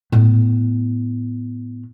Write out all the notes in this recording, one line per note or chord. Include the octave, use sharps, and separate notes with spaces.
A2 B3